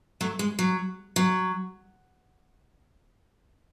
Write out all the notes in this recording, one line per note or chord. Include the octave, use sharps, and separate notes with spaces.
F#3 A3
G#3
F#3
F#3